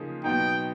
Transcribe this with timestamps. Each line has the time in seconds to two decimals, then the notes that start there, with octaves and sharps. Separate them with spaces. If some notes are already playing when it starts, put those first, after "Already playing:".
Already playing: C#3 F3 A#3 D#4 G#4
0.24 B2 F#3 B3 D#4 G5